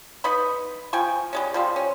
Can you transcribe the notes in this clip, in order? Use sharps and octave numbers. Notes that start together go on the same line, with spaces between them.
D#4 B4 D#5 B5
F3 G5 G#5 C#6
G3 G#3 C#4
F3 G3 C4
C#4